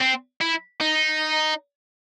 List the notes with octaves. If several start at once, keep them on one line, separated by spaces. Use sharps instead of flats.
C4
E4
D#4